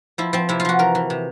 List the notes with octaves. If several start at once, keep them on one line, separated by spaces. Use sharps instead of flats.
F3 E4
F3 C4
C3 E4
F4
F3 F#4
E3 A#4
E3
C3